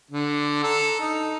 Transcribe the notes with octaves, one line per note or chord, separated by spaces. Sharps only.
D3
A4 A#5
D#4